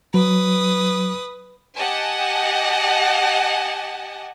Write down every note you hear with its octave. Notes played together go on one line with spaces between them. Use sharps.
F#3 B4 D#6
G4 D#5 F#5 G#5 A5